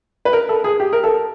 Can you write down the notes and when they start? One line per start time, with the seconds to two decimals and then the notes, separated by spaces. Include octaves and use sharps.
0.25 B4
0.33 A#4
0.49 A4
0.64 G#4
0.80 G4
0.93 A#4
1.04 A4